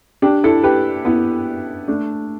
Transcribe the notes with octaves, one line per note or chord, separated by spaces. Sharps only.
D4 G4
E4 A4
G4 B4
B3 E4
A3 D4